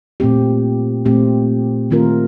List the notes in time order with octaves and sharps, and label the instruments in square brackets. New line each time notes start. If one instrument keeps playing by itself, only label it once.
[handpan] A#2 A3 C4 G4
A#2 A3 C4 G4
D#3 A3 C4 F4 A#4